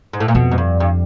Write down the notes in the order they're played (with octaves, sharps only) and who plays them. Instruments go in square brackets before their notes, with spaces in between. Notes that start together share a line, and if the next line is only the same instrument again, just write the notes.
[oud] G#2
A2
A#2
[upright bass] F2 [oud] B2
[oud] G#2
G2
G2